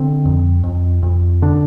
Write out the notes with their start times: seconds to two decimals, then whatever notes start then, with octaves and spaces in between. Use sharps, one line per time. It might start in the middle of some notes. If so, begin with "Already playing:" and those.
Already playing: D3 C4
0.25 F2
0.64 F2
1.03 F2
1.42 D3 D4